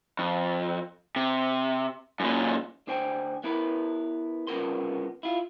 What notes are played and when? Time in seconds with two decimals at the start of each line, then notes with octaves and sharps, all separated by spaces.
0.19 F2
1.16 C3
2.20 F#2 A#2
2.87 D2 D4 C5 G5 G#5
3.44 B3 E4 A#4 B4
4.47 C2 C#3 B3 F4 A#4 C6
5.23 E4 F4